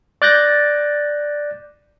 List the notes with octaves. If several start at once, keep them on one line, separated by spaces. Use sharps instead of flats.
D5 D6 F#6 G6 A6 A#6